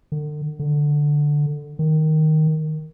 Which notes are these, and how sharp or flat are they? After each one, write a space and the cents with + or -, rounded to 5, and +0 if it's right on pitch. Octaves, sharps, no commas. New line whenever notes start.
D3 +40
D3 +5
D#3 +0